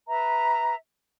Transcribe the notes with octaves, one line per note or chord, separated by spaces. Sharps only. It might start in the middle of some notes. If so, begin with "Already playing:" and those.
B4 E5 A#5